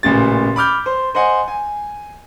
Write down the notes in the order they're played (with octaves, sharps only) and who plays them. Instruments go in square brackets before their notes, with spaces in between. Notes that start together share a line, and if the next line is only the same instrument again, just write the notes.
[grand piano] A1 A#2 C#3 A6
B5 D6 F6 G6
C5
C5 D#5 F#5 G#5
G#5